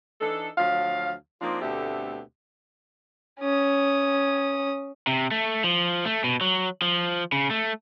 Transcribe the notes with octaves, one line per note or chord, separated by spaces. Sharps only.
E3 D4 D#4 A4
D2 F3 F#3 F5
F3 A#3 C4 D4 D#4 F4
D2 B2 D3 A3 C4 G4
C#4 D#6
C3
A3
F3
A3
B2
F#3
F3
C#3
A3